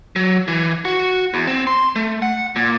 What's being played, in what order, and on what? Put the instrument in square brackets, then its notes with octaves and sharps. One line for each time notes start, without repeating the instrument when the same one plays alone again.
[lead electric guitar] F#3
E3
F#4
E2
C4
C6
A3
F#5
A#2